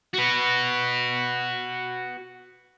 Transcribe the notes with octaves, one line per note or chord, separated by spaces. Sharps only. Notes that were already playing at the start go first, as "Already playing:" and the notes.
F#4 B4